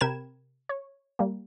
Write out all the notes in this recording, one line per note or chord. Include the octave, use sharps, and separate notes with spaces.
C3 A#4 G5 B5 G#6 E7
C#5
G3 A#3